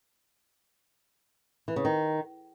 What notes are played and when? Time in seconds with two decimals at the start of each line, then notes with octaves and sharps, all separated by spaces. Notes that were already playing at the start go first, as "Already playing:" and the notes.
1.68 E3
1.76 C#3
1.85 D#3